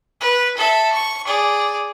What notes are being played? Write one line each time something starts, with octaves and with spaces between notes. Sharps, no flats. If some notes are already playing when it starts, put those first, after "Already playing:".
B4
A4 E5
C#6
G#4 D5